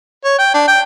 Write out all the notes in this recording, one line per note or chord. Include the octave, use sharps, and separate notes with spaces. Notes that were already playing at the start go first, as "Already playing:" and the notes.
C#5
G5
D4
G5